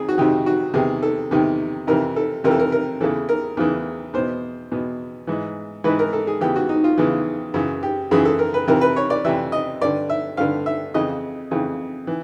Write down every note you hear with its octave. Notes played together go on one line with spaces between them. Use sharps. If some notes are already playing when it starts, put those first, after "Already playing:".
Already playing: F2 D#3 G#4
F#4
F2 C3 D#3 G4
F#4
E2 C3 D#3 G#4
A4
E2 C3 D#3
F2 C3 E3 A#4
A4
F2 C3 E3 A#4
A4
A#4
A#4
E2 C#3 E3 A4
A#4
E2 C#3 E3
E2 B2 C5
E2 B2
G#2 E3
G#2 E3 B4
A#4
A4
G#4
E2 C#3 E3 G4
F#4
D#4
F4
E2 C#3 E3
F#2 C#3 E3
G4
F#2 C#3 E3 G#4
A4
A#4
B4
F2 C3 E3 A#4
B4
C#5
D5
F2 C3 E3 E5
D#5
G2 D3 D5
E5
G2 D3 F5
E5
F2 C#3 E3 D#5
F2 C#3 E3
E3